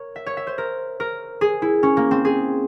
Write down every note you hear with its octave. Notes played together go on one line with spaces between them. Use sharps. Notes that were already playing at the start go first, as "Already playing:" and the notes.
Already playing: A#4 C#5
E5
C#5
E5
C5
A#4
A#4
G#4
E4
C#4
A#3
C4
G#4